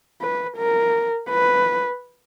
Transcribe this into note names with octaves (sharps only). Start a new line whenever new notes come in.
B4
A#4
B4